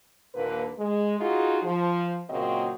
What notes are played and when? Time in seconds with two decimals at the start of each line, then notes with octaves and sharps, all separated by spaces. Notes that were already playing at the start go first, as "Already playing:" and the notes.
0.34 D#2 A#2 D3 A#3 B4
0.78 G#3
1.20 D#4 F4 F#4 G#4
1.63 F3
2.29 A#2 C#3 F#3 A#3 C4 D#5